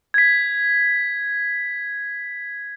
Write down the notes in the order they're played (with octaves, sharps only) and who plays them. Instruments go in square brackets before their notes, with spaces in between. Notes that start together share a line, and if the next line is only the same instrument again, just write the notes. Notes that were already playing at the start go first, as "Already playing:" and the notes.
[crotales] G#6 B6